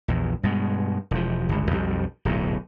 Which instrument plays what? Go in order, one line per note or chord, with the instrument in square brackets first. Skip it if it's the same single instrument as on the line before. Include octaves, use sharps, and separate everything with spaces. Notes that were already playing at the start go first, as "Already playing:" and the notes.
[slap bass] A#1 E2
G2 B2 G#3
E1 F3
G1 C#2
B1 F2 G3
D1 B1 G#2